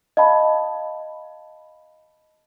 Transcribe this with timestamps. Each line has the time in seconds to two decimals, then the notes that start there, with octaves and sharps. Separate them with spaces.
0.17 D#5 F5 A5 B5